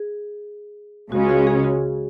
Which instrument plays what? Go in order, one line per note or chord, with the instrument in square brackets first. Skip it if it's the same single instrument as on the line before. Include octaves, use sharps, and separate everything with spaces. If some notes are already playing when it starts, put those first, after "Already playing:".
Already playing: [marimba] G#4
[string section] C#2 C#3 G#3 C#4 [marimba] F#4
[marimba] F#4
G#4
F#4